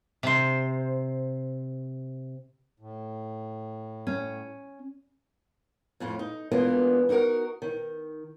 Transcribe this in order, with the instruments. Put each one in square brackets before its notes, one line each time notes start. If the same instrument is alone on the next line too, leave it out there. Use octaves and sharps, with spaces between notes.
[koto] C3 C5
[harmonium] A2
[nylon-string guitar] C#4
[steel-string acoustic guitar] F2 A2 F4
D#4
E3 G#3 A#3 B3 D4 F4
D#4 E4 F#4 A#4
D#3